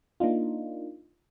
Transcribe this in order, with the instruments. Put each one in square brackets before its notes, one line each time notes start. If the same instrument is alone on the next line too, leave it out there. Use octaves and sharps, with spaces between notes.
[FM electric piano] A#3 D4 D#4 F4